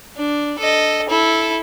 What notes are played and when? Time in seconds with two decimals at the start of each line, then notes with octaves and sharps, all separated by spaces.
0.17 D4
0.59 A4 D#5
1.09 E4 A4